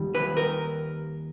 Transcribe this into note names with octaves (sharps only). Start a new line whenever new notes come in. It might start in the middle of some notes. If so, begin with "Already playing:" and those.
Already playing: D#2 D#3 G3
B4
A#4